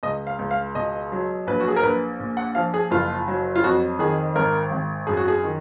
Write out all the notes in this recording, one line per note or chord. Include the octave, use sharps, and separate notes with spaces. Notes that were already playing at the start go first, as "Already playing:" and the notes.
C#2 D#5
F5
C#2
F5
B2 D#5
F#3
A#1 B4
F#4
G#4
A#4
A#1 B4
A#2
F#5
F3 F5
G#4
F#1 F4
F#3
F4
F2 F#4
D#3 G#4
G#1 A#4
G#1
F#2 G#4
F#4
G#4
D#3